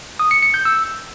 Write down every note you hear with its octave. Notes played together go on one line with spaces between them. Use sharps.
D#6
C#7
C#7
G6
E6